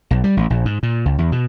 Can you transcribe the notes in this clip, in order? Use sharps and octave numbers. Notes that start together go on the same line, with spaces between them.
B1
G3
A1
A#1
G#2
A#2
C#2
E2
B2